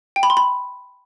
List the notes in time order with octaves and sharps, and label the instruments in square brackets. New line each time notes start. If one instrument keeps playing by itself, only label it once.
[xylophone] G5
B5
C6
B5